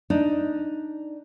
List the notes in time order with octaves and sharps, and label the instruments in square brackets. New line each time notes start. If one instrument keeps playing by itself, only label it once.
[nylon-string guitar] D4 D#4